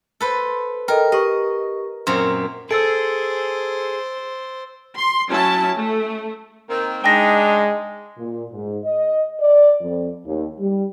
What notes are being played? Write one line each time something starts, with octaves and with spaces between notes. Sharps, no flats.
A4 B4 C5
A4 A#4 D#5 G5
G4 D#5 C#6
F#2 A#2 C4 C6
G#4 A4 C5 E6 A6 D7
C6
F#3 C#4 E4 A5
A3
D#3 A#3 C4
G#3 D4 D#4 G5 A#6
A#2
G#2
D#5
D5
F2
D#2
G3